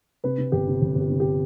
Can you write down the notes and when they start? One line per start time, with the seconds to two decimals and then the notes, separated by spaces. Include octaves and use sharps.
0.24 C3 B4
0.38 C3
0.52 G1 G4
0.68 C3
0.82 G1
0.95 G1
1.00 G4
1.10 C3
1.20 G4